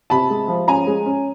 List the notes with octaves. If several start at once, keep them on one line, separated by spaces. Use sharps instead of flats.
C3 A5 B5
G#3
F3
C#4 G#5 A#5
G#3
C#4